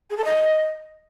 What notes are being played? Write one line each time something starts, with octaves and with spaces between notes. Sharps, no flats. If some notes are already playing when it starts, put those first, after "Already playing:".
G#4
A4
D#5